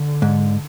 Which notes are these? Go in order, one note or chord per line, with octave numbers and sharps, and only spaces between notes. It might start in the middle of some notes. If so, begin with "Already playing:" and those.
Already playing: D3
G#2